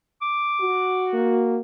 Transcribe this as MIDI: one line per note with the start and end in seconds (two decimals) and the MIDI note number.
0.22 1.16 86
0.61 1.59 66
1.14 1.61 58